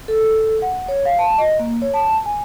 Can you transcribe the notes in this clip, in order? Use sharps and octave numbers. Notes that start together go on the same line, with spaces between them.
A4
F#5
C#5
F5
A5
D#5
A#3
C#5
A5
G#5